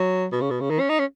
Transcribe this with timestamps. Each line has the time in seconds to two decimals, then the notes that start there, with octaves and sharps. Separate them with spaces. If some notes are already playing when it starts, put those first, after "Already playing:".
Already playing: F#3
0.32 B2
0.41 C#3
0.50 B2
0.60 C#3
0.70 D#3
0.80 C#4
0.89 D#4
0.99 C#4